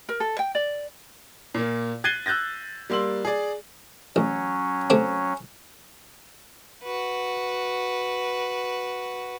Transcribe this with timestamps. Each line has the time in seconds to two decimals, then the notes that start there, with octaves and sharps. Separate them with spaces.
0.09 A#4
0.20 A4
0.39 G5
0.55 D5
1.54 A#2 A#3
2.04 F#6 G#6 A6 C7 D#7 G7
2.26 E6 F#6 G6 A6 A#6
2.90 G3 A#3 C6 E6 F#7
3.25 G#4 D5
4.16 A1 F#3 C#4
4.90 C3 A3 C4
6.83 F#4 B4